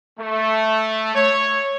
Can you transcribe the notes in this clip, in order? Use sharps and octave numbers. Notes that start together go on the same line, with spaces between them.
A3
C#5